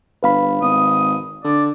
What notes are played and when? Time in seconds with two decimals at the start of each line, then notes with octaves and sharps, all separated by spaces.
0.23 G1 B4 F5 B5
0.62 G#1 D#6
1.44 D3 D5